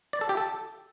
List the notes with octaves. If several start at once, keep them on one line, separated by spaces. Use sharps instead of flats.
D5
A4
G4
A4